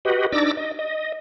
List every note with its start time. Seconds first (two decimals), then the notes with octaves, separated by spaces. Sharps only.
0.05 F#4 G4 B4 D#5
0.32 D4 D#4 D5 D6 E6 A#6
0.57 D#5
0.79 D#5